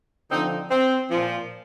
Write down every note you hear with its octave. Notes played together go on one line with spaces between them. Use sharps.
D3 F3 C4 D#4
C4
A#2 F3